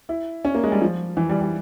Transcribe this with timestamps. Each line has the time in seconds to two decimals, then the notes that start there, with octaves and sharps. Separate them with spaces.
0.09 E4
0.45 C#4
0.55 A#3
0.64 G#3
0.72 G3
0.82 F3
1.17 E3
1.29 G3
1.41 G3